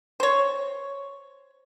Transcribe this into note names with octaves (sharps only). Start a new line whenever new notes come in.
C5 C#5